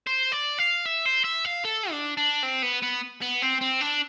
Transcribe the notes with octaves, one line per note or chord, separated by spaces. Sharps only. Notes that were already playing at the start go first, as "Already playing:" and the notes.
C5
D5
F5
E5
C5
E5
F5
A4
D4
D4
C4
B3
B3
B3
C4
C4
D4